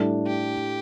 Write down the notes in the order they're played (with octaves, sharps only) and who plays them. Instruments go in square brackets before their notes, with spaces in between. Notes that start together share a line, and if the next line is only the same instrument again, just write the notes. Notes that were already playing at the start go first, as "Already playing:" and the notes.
Already playing: [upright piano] A2 G3 D4
[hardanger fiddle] G4